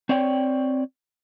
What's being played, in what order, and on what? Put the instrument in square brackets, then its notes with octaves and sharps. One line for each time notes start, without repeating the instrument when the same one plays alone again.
[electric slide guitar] C4 C#5 D5 G5